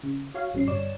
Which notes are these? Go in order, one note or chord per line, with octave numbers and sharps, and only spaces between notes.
C#3
F#4 C#5 F5
A1 F#3 C#4 C7
G1 G2 C#5 D5 E7